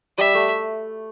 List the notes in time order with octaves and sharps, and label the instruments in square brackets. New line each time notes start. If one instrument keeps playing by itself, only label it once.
[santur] G3 [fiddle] E5
[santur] A3